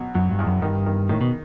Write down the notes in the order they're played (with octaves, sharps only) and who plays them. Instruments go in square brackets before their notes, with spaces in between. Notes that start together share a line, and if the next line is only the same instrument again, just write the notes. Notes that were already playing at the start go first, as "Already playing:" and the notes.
Already playing: [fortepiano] B2 F#3
[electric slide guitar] F#2 [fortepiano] F#3
[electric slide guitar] G2
[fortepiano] E2
[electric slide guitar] F#2
[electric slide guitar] G2 [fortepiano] D#3
[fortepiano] D#3
[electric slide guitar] A2 [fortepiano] D#3
[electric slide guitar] B2